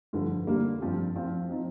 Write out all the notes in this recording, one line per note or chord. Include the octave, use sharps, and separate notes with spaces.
G2 D3 F3
D3 G3 A#3
G2 F3 C4
F3 C4 F4
F3 C4 D#4